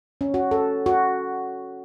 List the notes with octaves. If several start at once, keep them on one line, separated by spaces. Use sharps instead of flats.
C#4
F#4
A4
F#4